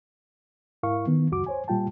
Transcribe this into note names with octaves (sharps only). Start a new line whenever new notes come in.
G#2 E4 A#4 F5 C#6
D#3 B3
C#2 F#2 F#4 D6
C5 C#5 G#5
A#2 G3 F4 G5 A5